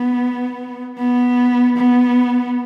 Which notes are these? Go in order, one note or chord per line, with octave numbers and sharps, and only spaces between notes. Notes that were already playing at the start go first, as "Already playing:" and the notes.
Already playing: B3
B3
B3